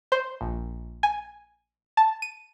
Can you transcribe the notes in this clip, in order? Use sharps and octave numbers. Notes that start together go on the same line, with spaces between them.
C5
A#1
G#5
A5
D#7